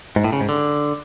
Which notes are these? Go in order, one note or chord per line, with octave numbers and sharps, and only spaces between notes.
G#2
A2
C#3
G#2
D3